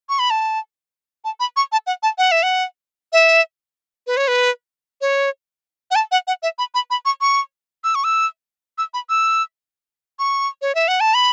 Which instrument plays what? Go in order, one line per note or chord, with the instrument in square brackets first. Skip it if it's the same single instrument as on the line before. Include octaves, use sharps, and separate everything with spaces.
[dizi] C#6
B5
A5
A5
B5
C#6
A5
F#5
A5
F#5
E5
F#5
E5
B4
C#5
B4
C#5
F#5
A5
F#5
F#5
E5
B5
B5
B5
C#6
C#6
E6
C#6
E6
E6
B5
E6
C#6
C#5
E5
F#5
A5
B5